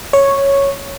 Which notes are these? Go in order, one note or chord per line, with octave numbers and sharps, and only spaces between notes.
C#5